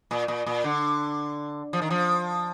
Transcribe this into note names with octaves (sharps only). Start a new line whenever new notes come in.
A#2
A#2
A#2
D3
F3
D#3
F3